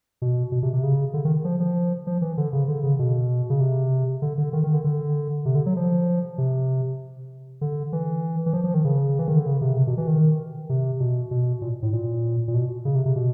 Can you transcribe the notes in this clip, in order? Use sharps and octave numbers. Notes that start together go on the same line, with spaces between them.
B2
B2
C3
C3
C#3
D3
D#3
F3
F3
F3
E3
D3
C#3
D3
C#3
B2
C#3
C3
D3
D3
D#3
D#3
D3
D3
C3
D3
F#3
F3
C3
D3
E3
E3
F3
F3
D#3
C#3
E3
D#3
D3
C#3
C3
C3
B2
E3
D#3
C3
B2
B2
A#2
A2
A#2
A#2
B2
C#3
C3
C3
B2